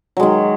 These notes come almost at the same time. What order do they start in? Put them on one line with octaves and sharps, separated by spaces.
F#3 G#3 D#3